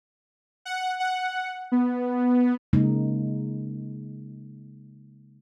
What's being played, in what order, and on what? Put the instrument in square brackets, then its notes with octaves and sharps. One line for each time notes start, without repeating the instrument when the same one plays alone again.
[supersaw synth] F#5
F#5
B3
[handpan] C#3 G#3 A#3 D#4